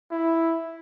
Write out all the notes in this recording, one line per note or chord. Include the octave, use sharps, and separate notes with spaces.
E4